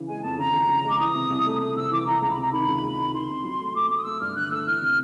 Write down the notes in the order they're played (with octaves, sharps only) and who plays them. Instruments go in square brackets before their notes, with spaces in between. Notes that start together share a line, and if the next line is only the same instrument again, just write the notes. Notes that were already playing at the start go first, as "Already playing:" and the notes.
Already playing: [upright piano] C#3 E3
[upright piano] G#3 [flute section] G#5
[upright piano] F2 [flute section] A5
[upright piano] C#3 [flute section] A#5
[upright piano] C#3
C#3
[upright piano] G#3 [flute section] D6
[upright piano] E3 [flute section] D#6
[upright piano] C3
C2
A3
[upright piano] A3 [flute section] D#6
[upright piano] C3 [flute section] E6
[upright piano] E3 [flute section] D6
[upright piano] E3 [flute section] A#5
[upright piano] C#2 [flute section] A#5
[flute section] B5
[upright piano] C3 [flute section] A#5
[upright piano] D#3 [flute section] B5
[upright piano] C#2
C#2
D#3
[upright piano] D#3 [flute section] C6
[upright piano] C3
F#3
A3
[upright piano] A3 [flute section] D6
[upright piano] A3 [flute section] D6
[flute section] D#6
[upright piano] A3 [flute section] E6
[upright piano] G2 [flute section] F6
[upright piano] D3 [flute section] F#6
[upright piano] A3 [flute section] E6
[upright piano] E3 [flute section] F6
[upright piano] C3